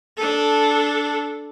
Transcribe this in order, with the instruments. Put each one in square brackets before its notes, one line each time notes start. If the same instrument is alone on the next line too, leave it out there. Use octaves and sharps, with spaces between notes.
[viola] D4 A4